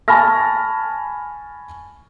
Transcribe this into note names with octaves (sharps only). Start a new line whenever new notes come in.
G#5 A5 B5 C#6 F6 A#6